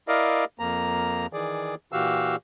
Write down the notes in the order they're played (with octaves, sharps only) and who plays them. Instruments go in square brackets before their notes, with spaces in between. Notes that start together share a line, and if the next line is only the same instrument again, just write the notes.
[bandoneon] E4 A#4 D5 D#5 F5
F2 A#3 A#5
D#3 E3 G#4 D5
A#2 E3 F#4 G4 F5 E6